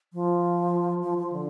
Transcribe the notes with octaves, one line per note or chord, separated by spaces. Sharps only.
F3
F3
F3
D3